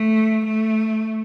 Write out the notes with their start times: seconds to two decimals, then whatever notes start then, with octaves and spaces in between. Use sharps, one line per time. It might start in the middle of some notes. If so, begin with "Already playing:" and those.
Already playing: A3
0.45 A3